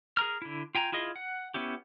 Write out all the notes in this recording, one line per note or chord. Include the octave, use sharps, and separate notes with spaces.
G#4 A#4 A#5 F6
D3 E4
F4 G5 G#5 A#5
E4 F4 G#4 D#5
F#5
B3 C#4 E4 G4